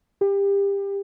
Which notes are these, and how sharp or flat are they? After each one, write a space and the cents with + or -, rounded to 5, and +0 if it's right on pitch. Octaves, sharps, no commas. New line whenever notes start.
G4 +25